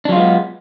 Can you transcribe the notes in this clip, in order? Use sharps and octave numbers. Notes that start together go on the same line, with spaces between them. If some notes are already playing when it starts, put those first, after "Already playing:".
F#3 G#3 B3 D4 F4